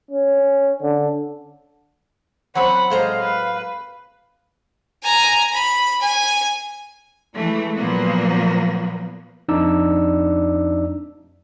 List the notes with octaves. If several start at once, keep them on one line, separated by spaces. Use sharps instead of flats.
C#4
D3
F#3 C4 F#5 B5
A2 G#3 C5 F5 A#5
B4
G#5 A#5
B5
G#5
E3 G#3 A3
A#2 F3 F#3 A#3 B3
F2 D4 D#4 D5 E6